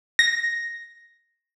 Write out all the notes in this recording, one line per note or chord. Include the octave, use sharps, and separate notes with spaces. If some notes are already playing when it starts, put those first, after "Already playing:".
A#6